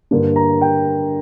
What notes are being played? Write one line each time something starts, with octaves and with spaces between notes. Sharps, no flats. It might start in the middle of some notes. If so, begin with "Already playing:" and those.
G2 D3 A#3 D4
A#5
G5